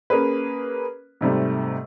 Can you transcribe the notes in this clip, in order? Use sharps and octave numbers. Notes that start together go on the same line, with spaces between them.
A#3 C#4 G#4 B4
G#2 C3 G3 A3